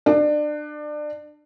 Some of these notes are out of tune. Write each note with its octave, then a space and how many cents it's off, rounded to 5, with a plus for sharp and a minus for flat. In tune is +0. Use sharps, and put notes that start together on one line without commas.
D4 +30